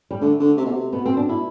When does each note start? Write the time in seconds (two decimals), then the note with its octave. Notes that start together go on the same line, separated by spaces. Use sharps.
0.11 G3
0.21 D3 A3
0.40 D3
0.57 C3
0.65 B2
0.73 C3
0.92 B2 B3
1.06 C4
1.17 D4
1.29 E4